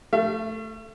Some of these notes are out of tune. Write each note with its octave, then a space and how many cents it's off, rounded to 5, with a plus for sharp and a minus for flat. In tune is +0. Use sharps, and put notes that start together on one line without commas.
A3 +0 E5 +45